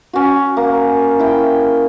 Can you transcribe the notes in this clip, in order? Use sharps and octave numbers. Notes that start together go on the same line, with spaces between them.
C#4 F#4
A#3
E4 G5